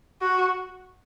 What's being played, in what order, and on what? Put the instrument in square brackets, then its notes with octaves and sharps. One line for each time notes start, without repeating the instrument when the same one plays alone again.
[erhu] F#4